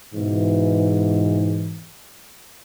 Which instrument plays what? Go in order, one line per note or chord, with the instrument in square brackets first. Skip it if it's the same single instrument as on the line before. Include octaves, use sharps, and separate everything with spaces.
[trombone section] G#2 B2 E3